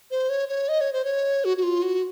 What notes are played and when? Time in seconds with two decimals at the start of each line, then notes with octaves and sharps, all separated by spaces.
0.11 C5
0.29 C#5
0.49 C#5
0.68 D#5
0.81 C#5
0.93 C5
1.05 C#5
1.45 F#4
1.57 F#4
1.63 F4
1.82 F#4